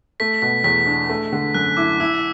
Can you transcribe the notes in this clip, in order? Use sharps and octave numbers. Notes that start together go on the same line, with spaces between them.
A3 B6
B2 B6
E2 B6
D4
A3
D3
F#2 F#6
E4 D6
E4 E6